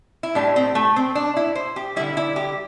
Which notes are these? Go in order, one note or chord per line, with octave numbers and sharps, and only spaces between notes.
E4
A2 G3 D4
C4
A3
C4
D4
E4
C5
G4
D3 G3 E4
E4
G4